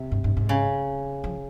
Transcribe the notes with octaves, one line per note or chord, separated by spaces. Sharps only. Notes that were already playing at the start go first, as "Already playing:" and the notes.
Already playing: C3
G2
G2
G#2
C#3
F3